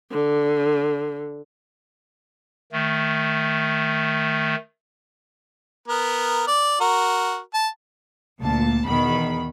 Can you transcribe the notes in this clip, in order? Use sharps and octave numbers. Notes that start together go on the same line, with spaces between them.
D3
D#3 A3
B3 A#4
D5
F#4 A#4
A5
D2 A#2 A5
E2 B2 D#3 B5